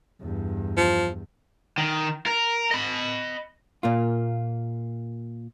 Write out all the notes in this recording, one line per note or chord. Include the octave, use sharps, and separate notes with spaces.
E2 G2
F3
D#3
A#4
D#5 B5
A#2 A#3 F4